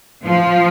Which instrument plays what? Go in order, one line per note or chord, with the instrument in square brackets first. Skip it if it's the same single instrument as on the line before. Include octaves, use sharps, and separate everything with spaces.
[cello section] F3